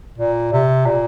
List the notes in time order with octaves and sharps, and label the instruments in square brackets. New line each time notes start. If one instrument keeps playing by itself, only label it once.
[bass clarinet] A#2
C3
A#2